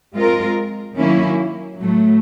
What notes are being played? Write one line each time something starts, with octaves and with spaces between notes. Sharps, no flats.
G#3 C4 F4 A#4
D#3 F#3 A#3 C#4 E4
A2 F#3 A3